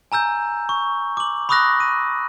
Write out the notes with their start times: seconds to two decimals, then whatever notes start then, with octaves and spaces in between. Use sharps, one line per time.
0.12 G#5 A#5 E6 G6
0.69 C#6
1.17 D6 F#7
1.49 B5 C#6 D#6 E6 F#6 A#6
1.80 D#7